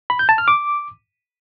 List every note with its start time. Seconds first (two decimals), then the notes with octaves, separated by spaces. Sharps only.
0.10 B5
0.19 G6
0.29 A5
0.38 F6
0.48 D6